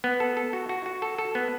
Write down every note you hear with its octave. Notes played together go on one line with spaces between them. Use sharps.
B3
A4
A4
F#4
F#4
F#4
A4
A4
B3